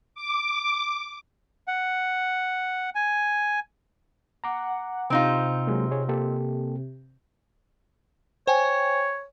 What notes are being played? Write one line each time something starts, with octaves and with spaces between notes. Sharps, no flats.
D6
F#5
G#5
F#5 A#5 D6
C3 C4 D#4 F4
F#3 G#3 A#3
G#4 C#5
A#3 G4 A4
C5 C#5 G5 G#5